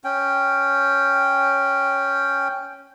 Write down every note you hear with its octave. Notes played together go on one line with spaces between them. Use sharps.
C#4 G5